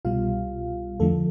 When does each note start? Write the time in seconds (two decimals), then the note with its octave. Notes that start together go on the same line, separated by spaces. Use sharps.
0.05 C2 B2 G3 F4 F5
1.00 F2 D3 F3 A3 A4